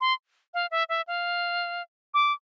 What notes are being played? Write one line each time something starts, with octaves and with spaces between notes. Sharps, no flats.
C6
F5
E5
E5
F5
D6